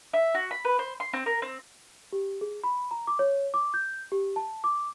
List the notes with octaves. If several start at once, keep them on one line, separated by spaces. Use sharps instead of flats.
E5
F#4
B5
B4
C5
C6
C4
A#4
C4
G4
G#4
B5
A#5
D6
C#5
D6
G6
G4
A5
D6